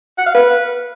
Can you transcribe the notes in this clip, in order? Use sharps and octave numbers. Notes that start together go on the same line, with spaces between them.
F#5
F5
B4